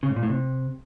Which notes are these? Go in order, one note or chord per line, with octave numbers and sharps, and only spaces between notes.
C#3
G#2
A#2
A2
C3